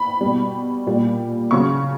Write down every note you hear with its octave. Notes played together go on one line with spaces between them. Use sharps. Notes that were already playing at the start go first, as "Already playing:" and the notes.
Already playing: B5
G3
B2
A#2 G3
C#3 F#3 C#6